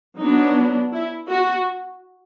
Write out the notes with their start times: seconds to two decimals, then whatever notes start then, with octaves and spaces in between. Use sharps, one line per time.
0.18 F#3 B3 D4 D#4
0.92 E4
1.29 F#4